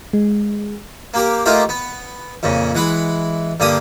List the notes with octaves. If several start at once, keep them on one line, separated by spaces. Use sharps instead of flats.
G#3
A#3 G4 A#4
A3 A#3 D#4 F4 G4 A#4
B3
F2 A#2 C#3
E3 G#3 F#5 B5
G2 D3 A#3 G4 D#6